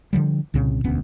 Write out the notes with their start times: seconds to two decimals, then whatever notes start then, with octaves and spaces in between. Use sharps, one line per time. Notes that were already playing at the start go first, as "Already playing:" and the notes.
0.13 D3 D#3 F3 G3
0.54 C2 A#2 C#3 C4
0.84 E1 D2 B3 C#4